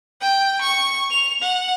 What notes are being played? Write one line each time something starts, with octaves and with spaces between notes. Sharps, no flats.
G5
C#6
F7
F#5